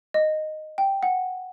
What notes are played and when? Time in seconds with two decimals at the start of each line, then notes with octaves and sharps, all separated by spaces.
0.14 D#5
0.78 G5
1.03 F#5